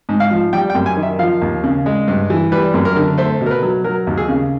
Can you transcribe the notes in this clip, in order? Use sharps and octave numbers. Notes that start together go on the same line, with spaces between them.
G#2
F5
F3
G3 G5
G5
F#2
G#5
D#3
E5
F3 F5
D#2
C#3
G#3
G2
E3
G3 B4
F#2
A#4
D3
A3 C5
B2
A#4
B4
F#3
F#3 A#4
D#2
G#4
C#3